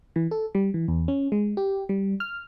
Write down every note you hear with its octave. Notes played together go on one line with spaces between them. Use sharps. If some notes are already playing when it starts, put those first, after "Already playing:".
E3
A4
G3
E3
E2
C#4
G#3
G4
G3
F6